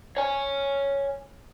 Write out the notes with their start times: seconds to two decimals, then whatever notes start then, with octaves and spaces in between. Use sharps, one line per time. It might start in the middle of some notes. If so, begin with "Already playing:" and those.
0.17 C#5 G#5